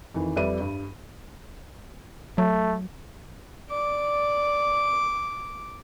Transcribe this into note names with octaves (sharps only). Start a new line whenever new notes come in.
F2 D#3 E3
F2 G3 B4 D5 E5 D#7
G2
F#3 A3
D5 D6